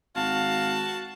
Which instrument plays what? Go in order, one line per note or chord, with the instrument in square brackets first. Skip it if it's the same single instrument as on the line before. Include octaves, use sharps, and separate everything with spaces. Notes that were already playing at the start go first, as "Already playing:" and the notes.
[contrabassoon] G#1 [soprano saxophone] F#4 [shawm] F5 [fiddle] A5